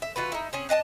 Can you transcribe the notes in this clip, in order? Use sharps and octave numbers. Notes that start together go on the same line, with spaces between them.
E5
E3 F4 F#4 B4
D#4 E4
C4 C#4 G#4
D4 D#5 F#5 A5